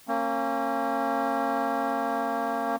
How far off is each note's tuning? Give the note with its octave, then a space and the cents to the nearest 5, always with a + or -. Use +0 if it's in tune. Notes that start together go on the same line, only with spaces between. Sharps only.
A#3 -25 C#4 -30